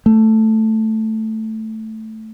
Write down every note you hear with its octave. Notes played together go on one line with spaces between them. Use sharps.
A3